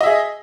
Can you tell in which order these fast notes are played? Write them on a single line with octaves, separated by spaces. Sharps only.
D#5 E5 G#4